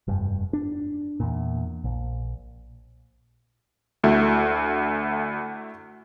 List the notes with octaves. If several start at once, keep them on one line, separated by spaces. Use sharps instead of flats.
F1 G2
D4
E2 A#2
A#1
D2 A3 E4 F#4